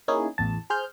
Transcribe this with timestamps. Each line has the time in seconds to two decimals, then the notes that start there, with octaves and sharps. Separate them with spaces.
0.08 A#3 C#4 D#4 E4 G#4
0.38 A1 E2 A5
0.70 G#4 C5 F6 G6